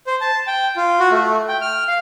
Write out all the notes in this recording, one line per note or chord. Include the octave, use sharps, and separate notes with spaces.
C5
A5
G5
F4
F#4
A3
G5
F6
F5